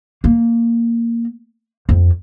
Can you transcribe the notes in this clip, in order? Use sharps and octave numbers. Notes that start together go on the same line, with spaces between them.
A#3
F2